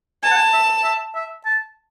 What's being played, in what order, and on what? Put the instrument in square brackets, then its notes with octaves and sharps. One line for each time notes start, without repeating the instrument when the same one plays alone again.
[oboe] G#5 [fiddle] A5
[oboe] F#5
G#5
E5
E5
E5
A5